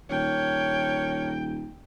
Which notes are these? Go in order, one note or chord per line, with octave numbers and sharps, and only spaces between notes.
D#1 D4 A#4 C#5 G5